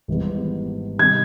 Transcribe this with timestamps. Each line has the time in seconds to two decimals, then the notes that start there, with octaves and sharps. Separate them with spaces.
0.08 G#1 G#2 E3 G3 B3
0.98 C3 D#3 G3 G#6